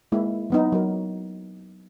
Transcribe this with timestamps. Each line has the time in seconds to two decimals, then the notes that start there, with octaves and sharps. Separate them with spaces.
0.12 G#3 A#3 E4
0.50 F#3 B3 D#4
0.72 F#3 A#4